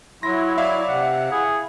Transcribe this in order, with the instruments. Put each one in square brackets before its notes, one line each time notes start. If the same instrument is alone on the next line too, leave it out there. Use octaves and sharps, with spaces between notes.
[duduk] F#3 [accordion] E4 [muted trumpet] C6 [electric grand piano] A#6
[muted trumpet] D5 [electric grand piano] E5 F5
[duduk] C3 [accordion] F#5
[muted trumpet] E4 [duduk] G#4